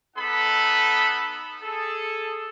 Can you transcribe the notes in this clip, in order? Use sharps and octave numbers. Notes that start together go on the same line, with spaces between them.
B3 D#4 A4 F#5 B5
G#4 A4